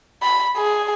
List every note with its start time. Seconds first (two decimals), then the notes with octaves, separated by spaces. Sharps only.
0.22 B5
0.57 G#4